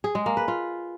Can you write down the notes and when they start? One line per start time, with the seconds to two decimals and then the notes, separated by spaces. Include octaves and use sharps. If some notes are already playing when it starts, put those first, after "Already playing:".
0.04 G#4
0.15 G#3
0.26 A#3
0.37 B4
0.48 F4